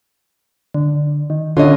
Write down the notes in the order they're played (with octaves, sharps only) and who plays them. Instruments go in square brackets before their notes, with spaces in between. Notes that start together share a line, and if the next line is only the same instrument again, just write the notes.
[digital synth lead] D3
D#3
[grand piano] D3 [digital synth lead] C#4 [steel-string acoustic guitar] F4 C#5 D#5